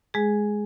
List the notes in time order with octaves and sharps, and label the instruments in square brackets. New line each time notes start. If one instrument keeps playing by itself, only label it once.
[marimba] G#3 G#4